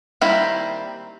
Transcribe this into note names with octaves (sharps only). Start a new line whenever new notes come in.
D#3 G3 A#3 C4 E4